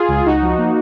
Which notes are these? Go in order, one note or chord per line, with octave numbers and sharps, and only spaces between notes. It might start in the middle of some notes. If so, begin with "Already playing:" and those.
Already playing: F4 G#4
C#2
C#2 D#4 F#4
F3
A#3